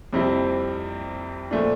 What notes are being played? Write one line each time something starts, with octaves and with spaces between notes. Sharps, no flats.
F2 C3 G3 C4 E4
A#2 F3 A3 D4